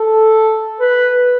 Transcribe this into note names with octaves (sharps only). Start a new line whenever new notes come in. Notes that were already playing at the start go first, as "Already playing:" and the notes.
Already playing: A4
B4